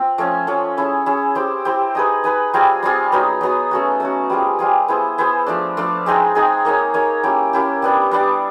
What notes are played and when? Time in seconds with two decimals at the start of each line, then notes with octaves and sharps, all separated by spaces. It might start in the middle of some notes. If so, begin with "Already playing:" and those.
Already playing: C4 F4
0.18 F3 A3 C#4
0.47 F3 A3 C#4
0.77 C#4 E4 G#4
1.06 C#4 E4 G#4
1.35 C4 E4 G4 C5
1.65 C4 E4 G4 C5
1.95 D#4 G#4 B4
2.24 D#4 G#4 B4
2.54 G3 C4 F4 G#4
2.83 G3 C4 F4 G#4
3.12 F#3 B3 D#4
3.41 F#3 B3 D#4
3.71 A3 C#4 F#4
4.00 A3 C#4 F#4
4.30 G3 C4 F4 G#4
4.59 G3 C4 F4 G#4
4.88 B3 E4 G#4 C5
5.18 B3 E4 G#4 C5
5.47 F3 A3 D4
5.77 F3 A3 D4
6.06 G#3 C4 D#4 G#4
6.35 G#3 C4 D#4 G#4
6.65 A#3 D#4 G#4 C#5
6.94 A#3 D#4 G#4 C#5
7.23 A#3 C#4 E4 G4
7.53 A#3 C#4 E4 G4
7.82 G3 B3 D4
8.11 G3 B3 D4